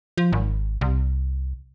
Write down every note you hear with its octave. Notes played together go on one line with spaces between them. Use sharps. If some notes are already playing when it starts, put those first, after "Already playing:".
F3
G#1
C2